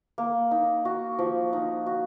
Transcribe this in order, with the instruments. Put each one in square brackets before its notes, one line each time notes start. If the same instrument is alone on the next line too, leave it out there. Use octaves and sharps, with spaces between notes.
[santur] A#3
D#4
F#4
F3
D#4
F#4